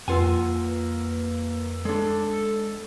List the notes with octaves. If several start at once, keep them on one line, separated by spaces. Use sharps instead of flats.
F2 A#3 F4 B4 F#5 G#5 E6
G#3 D4 A4